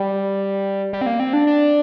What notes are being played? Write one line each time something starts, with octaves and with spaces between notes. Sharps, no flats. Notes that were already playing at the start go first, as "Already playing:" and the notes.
Already playing: G3
G3
C4
A#3
C4
D4
D4